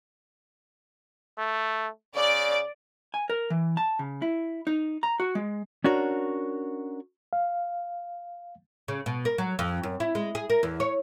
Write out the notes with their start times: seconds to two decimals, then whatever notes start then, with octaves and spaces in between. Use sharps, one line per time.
1.38 A3
2.16 C#3 D5
3.14 G#5
3.30 A#4
3.50 E3
3.77 A5
3.99 C#3
4.22 E4
4.67 D#4
5.03 A#5
5.20 F#4
5.35 G#3
5.84 C#4 D4 F#4 A#4 C#5
7.33 F5
8.88 C#3
9.06 B2
9.25 A#4
9.38 F#3
9.59 F2
9.83 F#2
10.00 E4
10.15 G#3
10.35 G#4
10.50 A#4
10.63 E2
10.80 C#5